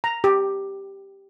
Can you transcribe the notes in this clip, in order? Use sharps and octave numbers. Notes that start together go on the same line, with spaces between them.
A#5
G4